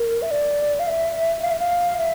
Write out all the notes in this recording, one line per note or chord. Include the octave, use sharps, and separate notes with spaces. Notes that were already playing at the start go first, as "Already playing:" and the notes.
Already playing: A#4
E5
D5
F5
E5
F5
E5
F5
E5